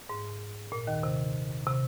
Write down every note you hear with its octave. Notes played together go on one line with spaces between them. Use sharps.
G#2
A#2
D#2 D#3
C3
C3